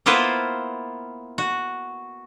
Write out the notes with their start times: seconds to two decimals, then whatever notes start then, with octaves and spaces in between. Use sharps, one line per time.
0.06 A#3 B3 E4 F4 B4 C5
1.38 F#4